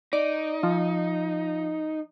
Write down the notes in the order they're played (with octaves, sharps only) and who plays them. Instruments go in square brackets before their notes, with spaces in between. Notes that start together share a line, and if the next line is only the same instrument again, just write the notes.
[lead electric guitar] D#4 [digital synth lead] D5
[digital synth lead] F3